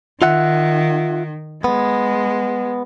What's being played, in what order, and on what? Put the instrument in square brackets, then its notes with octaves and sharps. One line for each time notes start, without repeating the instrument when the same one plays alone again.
[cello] D#3 [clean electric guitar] F4 E5 F#5
[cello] G#3 [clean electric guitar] B3